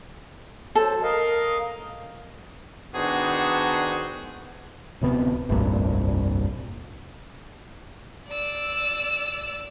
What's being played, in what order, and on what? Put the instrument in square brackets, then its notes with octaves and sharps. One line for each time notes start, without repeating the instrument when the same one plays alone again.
[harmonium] F#3 C5 [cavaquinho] A4
[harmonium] A#4 D#5 F5
[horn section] D#3 B3 D4 F#4 G#4 C5
[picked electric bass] D1 C3 B3
F1 C2 G2 A#2
[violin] D5 E6